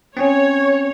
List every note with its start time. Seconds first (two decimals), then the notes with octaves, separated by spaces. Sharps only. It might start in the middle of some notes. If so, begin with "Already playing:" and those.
0.17 C4 C#4 C#5